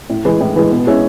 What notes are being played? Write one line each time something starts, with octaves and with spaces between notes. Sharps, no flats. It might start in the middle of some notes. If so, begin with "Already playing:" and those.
A2
E3 G#3
A2
E3 G#3
B2
G#3 C#4 E4